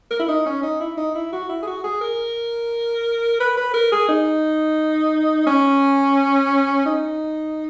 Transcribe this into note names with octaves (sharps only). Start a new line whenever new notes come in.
A#4
E4
D#4
C#4
D#4
E4
D#4
E4
F#4
E4
G#4
F#4
G#4
A#4
B4
B4
A#4
G#4
D#4
C#4
D#4